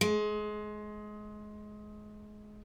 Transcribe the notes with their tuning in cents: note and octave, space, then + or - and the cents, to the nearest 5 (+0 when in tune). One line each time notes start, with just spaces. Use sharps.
G#3 +25